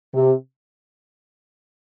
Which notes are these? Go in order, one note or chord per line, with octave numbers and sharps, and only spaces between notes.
C3